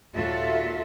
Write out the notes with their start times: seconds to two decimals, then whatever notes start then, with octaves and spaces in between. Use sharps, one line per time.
0.16 D#2 A#2 F4 F#4 A4 E5